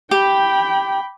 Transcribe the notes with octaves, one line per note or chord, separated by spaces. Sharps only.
G4 G5 B5